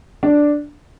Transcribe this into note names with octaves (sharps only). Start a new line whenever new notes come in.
D4